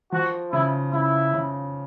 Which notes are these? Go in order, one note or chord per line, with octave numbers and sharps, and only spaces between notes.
F3 F#4
C#3 E4
C#3 E4
C#3